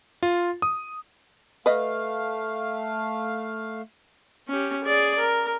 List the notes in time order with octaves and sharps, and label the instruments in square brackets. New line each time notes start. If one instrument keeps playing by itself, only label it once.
[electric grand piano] F4
D#6
[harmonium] A3 F5 [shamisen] B4 D#5
[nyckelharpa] C#4 G4
G#4 D5
A#4